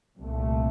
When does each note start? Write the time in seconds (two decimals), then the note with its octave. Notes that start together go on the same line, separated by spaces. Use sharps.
0.18 C2 A#2 A3